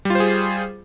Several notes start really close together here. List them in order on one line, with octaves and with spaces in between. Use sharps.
G3 F4 C5 G#4